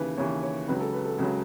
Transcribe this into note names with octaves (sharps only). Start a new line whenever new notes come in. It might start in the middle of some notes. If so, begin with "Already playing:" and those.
Already playing: D#2 C#3 E3 B4
D#2 C#3 E3 C#5
C#5
C#2 C#3 F#3 B4
A4
B4
A4
C#2 C#3 F#3